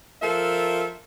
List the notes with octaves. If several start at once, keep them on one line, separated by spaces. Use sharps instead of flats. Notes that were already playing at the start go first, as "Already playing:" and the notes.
F3 F4 A4 A#4 E5